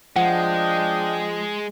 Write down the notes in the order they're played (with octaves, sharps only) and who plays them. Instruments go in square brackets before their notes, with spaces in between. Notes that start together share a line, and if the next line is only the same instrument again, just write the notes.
[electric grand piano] F3 [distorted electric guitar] G#3 [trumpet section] D4 D#5 G5 [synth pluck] F#5